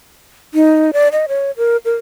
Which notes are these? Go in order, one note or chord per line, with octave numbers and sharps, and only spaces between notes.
D#4
D5
D#5
C#5
A#4
A#4